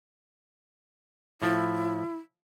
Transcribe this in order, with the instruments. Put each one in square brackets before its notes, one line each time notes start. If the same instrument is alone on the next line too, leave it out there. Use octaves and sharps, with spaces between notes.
[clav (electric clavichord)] A2 F3 [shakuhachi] E4